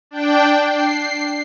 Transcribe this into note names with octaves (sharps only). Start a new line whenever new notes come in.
D4 G5
C7